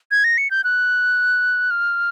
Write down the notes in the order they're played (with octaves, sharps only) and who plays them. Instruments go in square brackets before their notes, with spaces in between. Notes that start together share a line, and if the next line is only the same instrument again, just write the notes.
[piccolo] G#6
A#6
C#7
G6
F#6
F6